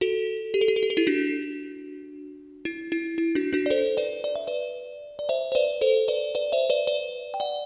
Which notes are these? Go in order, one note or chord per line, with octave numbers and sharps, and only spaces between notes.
F#4 A4
G4
A4
G4
A4
G4
A4
E4 G4
D4 F#4
E4
E4
E4
D4 F#4
D4 F#4
D5
A4 C5
B4 D5
D5
E5
B4 D5
D5
C5 E5
C5
B4 D5
A4 C5
B4 D5
B4 D5
C5 E5
B4 D5
B4 D5
G5
D5 F#5